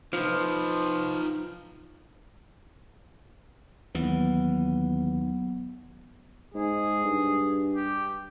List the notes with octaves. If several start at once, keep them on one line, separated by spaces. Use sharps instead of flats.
F3 D#4 B4
D#2 E3 F#3 B3
G#2 G#4
G2
G4